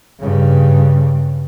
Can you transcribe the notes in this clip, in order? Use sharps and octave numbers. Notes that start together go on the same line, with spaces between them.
G2 C#3